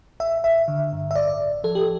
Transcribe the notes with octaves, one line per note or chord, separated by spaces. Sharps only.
A1 E5
A1 E5
D3
G2
E5
A1 D5
A1
F3 A4
G4